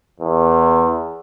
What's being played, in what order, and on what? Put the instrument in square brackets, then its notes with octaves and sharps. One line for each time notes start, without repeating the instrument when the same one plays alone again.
[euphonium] E2